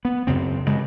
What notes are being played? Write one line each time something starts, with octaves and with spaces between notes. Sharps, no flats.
B3
F#2 C#3 C4
G2 C#3 G#3